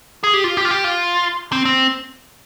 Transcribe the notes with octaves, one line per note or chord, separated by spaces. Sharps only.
G#4
G4
F4
G4
F4
G4
F4
C4
C4